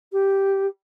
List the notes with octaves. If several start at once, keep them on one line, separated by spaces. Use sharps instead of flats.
G4